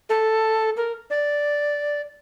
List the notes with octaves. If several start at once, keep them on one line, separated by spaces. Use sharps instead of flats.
A4
A#4
D5